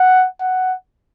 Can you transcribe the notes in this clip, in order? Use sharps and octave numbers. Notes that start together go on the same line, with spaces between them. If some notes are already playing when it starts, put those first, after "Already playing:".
Already playing: F#5
F#5